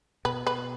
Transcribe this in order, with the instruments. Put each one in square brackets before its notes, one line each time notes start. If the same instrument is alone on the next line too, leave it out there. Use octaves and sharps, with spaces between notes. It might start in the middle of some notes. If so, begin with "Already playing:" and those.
[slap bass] B2 [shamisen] B4
[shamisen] B4